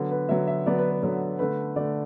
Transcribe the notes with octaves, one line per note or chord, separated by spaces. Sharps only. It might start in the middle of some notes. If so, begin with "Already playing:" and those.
Already playing: D3 F#3 B3
B4
D3 F#3 B3 E5
E5
D3 F#3 B3 D5
B4
B4
D3 F#3 B3
D3 A3 B4
D3 A3 D5